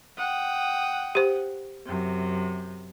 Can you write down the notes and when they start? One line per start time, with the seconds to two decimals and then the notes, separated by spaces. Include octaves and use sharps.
0.17 F#5 G5 D#6
1.15 G4 C5
1.86 F#2 C3